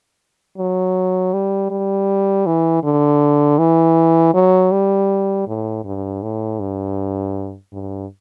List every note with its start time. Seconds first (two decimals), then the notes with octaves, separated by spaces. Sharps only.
0.58 F#3
1.33 G3
1.71 G3
2.46 E3
2.84 D3
3.59 E3
4.34 F#3
4.72 G3
5.48 A2
5.85 G2
6.22 A2
6.60 G2
7.73 G2